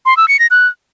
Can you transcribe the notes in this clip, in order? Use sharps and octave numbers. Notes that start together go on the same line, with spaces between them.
C6
E6
C#7
A#6
F#6